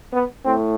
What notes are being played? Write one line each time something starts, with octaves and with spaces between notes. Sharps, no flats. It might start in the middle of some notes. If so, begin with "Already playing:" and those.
B3
A2 C4